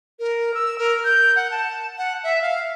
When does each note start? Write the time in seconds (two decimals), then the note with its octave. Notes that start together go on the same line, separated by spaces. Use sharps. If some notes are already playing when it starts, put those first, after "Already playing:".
0.20 A#4
0.54 E6
0.79 A#4
1.05 G6
1.36 F#5
1.51 A5
1.98 F#5
2.24 E5
2.42 F5